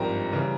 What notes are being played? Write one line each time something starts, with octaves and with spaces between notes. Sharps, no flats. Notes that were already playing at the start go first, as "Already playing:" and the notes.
Already playing: G#1 G2 F3 G5 A#5
C#3 E3 G3